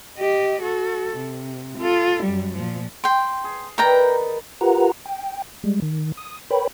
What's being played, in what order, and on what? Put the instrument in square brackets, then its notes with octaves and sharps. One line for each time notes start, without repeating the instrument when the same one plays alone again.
[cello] G4 D#5
F#4 A4
C3
F4 A4
F#2 G3
A#2 F3
[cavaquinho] G5 C6
[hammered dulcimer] G#4
[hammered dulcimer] D#3 B4 D5 [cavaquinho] A#4 G5 A#5
[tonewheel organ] F4 G4 A#4 B4 F#5 A#5
G5
G3 G#3
D#3
D#6
A#4 B4 C#5 G5 B5